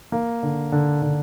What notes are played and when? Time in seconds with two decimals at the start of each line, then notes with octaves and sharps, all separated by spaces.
0.12 A#3
0.43 D3
0.72 D3
1.02 D3